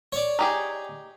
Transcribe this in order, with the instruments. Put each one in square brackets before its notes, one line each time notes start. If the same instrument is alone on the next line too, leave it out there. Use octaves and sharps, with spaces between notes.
[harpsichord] C#5 D5
[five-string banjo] D#4 G4 G#4